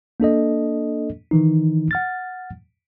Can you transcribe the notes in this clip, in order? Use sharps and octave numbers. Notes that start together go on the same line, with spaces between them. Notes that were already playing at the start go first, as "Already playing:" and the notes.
A#3 D4 A4 D#5
D#3 E3 D#4
F#5 F6 A6